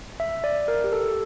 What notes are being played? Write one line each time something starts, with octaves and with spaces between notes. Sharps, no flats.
E5
D5
A#4
G4
A4